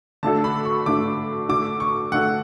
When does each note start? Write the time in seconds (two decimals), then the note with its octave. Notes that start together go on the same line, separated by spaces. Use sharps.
0.23 D3 A3 D4 F#4 A4 A5
0.44 B5
0.65 C#6
0.86 D3 A3 D4 F#4 A4 D6
1.49 D3 A3 D4 F#4 A4 D6
1.80 C#6
2.12 D3 A3 D4 F#4 A4 F#5